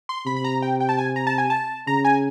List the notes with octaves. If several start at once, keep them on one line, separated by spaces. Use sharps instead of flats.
C6
C3 B5
B5
A#5
G5
G5
A5
G#5
A#5
A5
G#5
A5
C#3 A#5
G#5